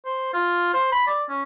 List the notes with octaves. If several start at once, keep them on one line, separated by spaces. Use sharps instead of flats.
C5
F4
C5
B5
D5
C#4